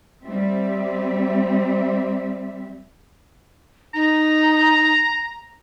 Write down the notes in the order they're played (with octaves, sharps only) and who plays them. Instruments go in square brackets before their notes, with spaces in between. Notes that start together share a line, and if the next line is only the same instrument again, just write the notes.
[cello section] G3 C4 E5
[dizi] D#4 [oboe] A#5